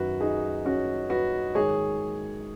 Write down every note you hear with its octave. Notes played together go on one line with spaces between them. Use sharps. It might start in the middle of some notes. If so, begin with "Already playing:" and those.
Already playing: F#2 D#3 F#4 B4
D#4 G#4
C#4 F#4
F#4 B4
G#2 D#3 G#4 C#5